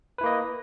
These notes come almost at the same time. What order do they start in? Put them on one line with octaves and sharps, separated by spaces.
B4 E4 A#3 D#5